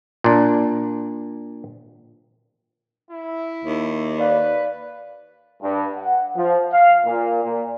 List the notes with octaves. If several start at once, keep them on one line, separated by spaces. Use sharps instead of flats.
A#2 D4
E4
D#2
B4 D5 F5
G2
F#5
F3
F5
A#2
A#2